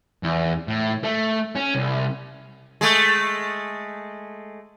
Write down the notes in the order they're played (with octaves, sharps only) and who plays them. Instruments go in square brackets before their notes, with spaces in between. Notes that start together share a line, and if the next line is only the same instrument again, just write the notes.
[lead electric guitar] E2
A2
A3
C#4
C2
[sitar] G#3 A3